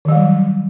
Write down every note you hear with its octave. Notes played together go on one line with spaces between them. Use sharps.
D#3 F#3 G3